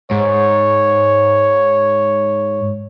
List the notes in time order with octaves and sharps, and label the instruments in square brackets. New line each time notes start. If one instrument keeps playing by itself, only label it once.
[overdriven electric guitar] G#2 [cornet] C#5